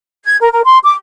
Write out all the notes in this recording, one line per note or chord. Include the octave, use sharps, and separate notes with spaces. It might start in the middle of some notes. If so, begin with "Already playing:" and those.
G#6
A#4
A#4
C6
D6